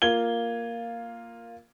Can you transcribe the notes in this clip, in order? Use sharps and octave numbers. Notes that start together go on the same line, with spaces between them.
A#3 F4 G#6 G7